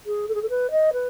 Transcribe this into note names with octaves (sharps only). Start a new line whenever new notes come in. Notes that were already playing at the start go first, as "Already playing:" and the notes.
G#4
A4
G#4
A4
B4
D#5
B4